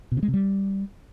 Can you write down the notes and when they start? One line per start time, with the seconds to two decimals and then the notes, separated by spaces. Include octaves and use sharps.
0.12 B2
0.17 C#3
0.23 G#3
0.28 C3
0.34 G3